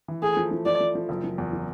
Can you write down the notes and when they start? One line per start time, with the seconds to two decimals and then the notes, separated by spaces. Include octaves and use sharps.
0.08 E3
0.22 A3 G#4
0.37 F3
0.51 F3
0.66 F3 D5
0.81 F3
0.95 F3
1.09 F#1
1.24 F3
1.38 E2
1.53 F3